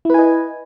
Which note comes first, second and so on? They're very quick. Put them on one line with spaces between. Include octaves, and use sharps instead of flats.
E4 B4 G#5 D#5